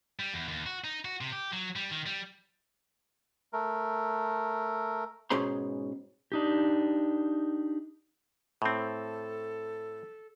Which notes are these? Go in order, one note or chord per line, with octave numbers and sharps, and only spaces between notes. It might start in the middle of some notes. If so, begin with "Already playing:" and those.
G3
E2
D#2
F#4
D#4
F#4
C3
G4
F#3
G3
D#3
G3
A3 A#4
G#2 B2 C#4 G#4 A#5 C6
D4 D#4 G4
A2 C4 A4